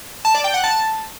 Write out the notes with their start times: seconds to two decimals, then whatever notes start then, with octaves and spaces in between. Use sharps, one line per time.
0.25 A5
0.34 D5
0.44 G5
0.54 F#5
0.64 A5